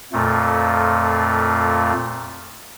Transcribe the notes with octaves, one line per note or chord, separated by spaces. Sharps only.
F2 A#2 A3